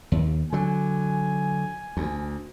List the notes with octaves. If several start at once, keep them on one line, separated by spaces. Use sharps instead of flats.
D#2
D3 F#3 G#5
D2